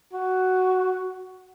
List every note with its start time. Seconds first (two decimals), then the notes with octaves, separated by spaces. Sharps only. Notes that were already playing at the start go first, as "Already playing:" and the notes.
0.13 F#4